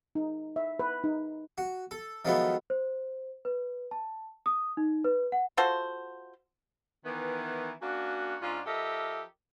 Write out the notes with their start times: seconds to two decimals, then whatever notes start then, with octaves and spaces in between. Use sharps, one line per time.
0.15 D#4
0.56 E5
0.79 B4
1.04 D#4
1.58 F#4
1.91 A4
2.25 D#3 F3 F#3 G#3 A3 B3
2.70 C5
3.45 B4
3.91 A5
4.46 D#6
4.77 D#4
5.04 B4
5.32 F#5
5.57 F4 F#4 A4 C5
7.04 D#3 E3 B3
7.81 A#3 C#4 D4 F#4
8.41 G#2 C#4 D4 F4
8.66 F3 G4 A4 A#4 D#5 E5